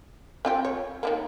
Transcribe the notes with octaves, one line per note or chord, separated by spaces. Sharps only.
C4 F4 G4
C#5
D#3 G3 A#3